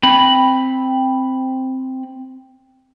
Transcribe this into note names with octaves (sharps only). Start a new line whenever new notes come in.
C4 B5